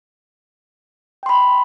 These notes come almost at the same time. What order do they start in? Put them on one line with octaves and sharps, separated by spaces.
G5 C6 B5